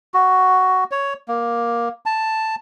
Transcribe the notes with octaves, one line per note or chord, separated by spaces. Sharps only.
F#4
C#5
A#3
A5